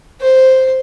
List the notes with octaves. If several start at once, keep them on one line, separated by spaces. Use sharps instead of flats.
C5